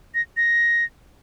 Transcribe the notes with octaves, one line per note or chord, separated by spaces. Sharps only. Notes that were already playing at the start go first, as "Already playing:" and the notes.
A#6
A#6